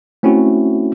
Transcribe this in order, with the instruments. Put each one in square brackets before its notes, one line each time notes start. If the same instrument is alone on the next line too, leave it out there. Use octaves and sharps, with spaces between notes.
[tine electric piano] A3 C4 C#4 E4 F#4